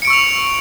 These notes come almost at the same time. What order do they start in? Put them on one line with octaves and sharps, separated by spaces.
C#7 D7 C#6 E6 F7